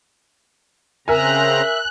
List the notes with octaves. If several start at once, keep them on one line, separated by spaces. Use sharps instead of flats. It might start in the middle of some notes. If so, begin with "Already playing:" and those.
C#3 C4 A#4 E5 G#5 A#5 F#6